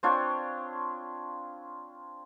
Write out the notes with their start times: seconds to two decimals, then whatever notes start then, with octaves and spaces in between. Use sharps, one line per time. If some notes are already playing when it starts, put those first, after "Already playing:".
0.03 C4 D4 F4 C#5